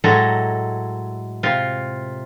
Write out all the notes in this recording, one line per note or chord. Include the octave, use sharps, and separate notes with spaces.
A2 F#3 G#3 A4 D#5 A#5
C3 F4